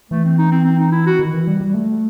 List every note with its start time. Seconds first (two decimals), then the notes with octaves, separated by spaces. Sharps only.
0.11 E3 A3
0.24 C4
0.38 D#4
0.52 C4
0.64 C4
0.79 D#4
0.92 E4
1.07 F#4
1.19 D#3
1.33 E3
1.47 G3
1.61 G3
1.74 A3